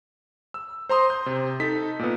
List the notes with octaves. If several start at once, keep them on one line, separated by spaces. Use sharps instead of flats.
E6
C5 A#5 C6 D#6
G6
C3
D#4 A4 B6
A#2 B3